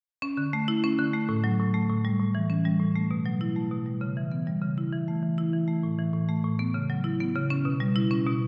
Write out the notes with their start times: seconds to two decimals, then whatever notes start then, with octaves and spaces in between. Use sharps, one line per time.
0.22 C#4
0.37 D3
0.53 A3
0.68 E4
0.84 C#4
0.99 D3
1.14 A3
1.29 A2
1.44 F#3
1.59 A2
1.74 A3
1.90 A2
2.05 G3
2.19 A2
2.35 E3
2.50 C#4
2.65 G3
2.80 A2
2.96 A3
3.11 B2
3.26 F#3
3.41 E4
3.56 A3
3.71 B2
3.86 G3
4.01 C#3
4.17 E3
4.32 B3
4.47 G3
4.62 C#3
4.78 E4
4.93 E3
5.08 A3
5.23 E3
5.38 E4
5.53 E3
5.68 A3
5.83 A2
5.99 E3
6.14 A2
6.29 A3
6.44 A2
6.59 B3
6.74 C#3
6.90 F#3
7.04 E4
7.20 B3
7.36 C#3
7.50 C#4
7.65 B2
7.80 G3
7.96 E4
8.11 C#4
8.26 B2